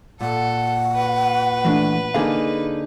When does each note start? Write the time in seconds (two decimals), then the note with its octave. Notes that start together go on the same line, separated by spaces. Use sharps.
0.21 A#2 A4 F#5
0.96 B4
1.65 E3 A3 D4
2.14 D3 A#3 D#4 G#4 F5